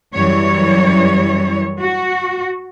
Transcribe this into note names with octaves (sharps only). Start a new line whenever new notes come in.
F#2 E3 F#3 G3 C#5
F#4